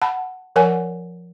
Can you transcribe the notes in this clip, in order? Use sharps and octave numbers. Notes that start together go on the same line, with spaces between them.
F#5 A5 B5
F3 A#4 C#5 F#5 G#5